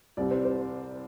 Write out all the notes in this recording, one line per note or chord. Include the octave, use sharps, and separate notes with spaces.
C2 C3 G3 C4 D5
C5
C5